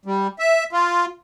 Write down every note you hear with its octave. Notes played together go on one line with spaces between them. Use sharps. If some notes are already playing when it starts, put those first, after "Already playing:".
G3
E5
F4